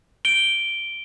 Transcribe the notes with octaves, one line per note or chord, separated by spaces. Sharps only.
D7 G7